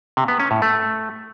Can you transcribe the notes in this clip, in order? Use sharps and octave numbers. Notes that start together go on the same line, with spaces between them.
C3
B3
C#4
A2
A3